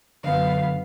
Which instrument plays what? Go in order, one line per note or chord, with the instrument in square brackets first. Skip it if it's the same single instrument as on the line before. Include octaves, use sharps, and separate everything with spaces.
[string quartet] F#2 B3 F5 [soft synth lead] D3